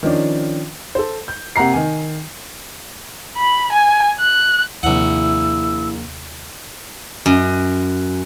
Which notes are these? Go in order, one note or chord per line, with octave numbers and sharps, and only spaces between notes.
D#3 F3 C#4 D4
A4 C5
G6
C3 A#3 F#5 A#5 C7
D#3 G#5
B5
G#5
F#6
A#1 D#2 C3 E4 F#5 E6
F#2